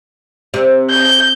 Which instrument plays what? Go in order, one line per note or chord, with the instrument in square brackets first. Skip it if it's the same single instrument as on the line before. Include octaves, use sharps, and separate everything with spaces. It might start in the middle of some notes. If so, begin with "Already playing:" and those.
[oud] C3
[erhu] G6